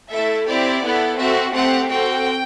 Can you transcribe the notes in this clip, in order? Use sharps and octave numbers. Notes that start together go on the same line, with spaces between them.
A3 E4 A4 E5
C4 E4 G4 D5
B3 E4 A4
C4 F#4 A4 E5
A3 C4 G4 F#5
C4 F#4 A4 G5